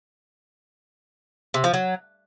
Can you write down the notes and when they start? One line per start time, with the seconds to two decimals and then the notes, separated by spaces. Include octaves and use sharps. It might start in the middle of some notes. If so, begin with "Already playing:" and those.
1.54 C3
1.64 F3
1.74 F#3